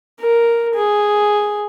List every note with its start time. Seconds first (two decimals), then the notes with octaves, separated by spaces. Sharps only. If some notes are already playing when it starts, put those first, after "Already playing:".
0.21 A#4
0.75 G#4